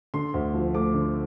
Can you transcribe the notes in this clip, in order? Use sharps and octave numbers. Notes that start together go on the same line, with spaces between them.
D3 C6
D2
F3
A3 D6
D3